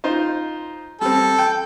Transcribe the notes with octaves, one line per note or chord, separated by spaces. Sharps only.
D#4 F4 C5
G3 C4 A4
G5